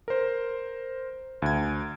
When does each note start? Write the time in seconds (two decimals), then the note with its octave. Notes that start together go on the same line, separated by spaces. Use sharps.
0.08 A#4 C5
1.42 D2 G#6